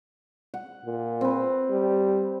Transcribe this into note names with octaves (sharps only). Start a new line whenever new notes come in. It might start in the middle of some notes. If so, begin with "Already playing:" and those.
F#5
A#2
C4 B4
G3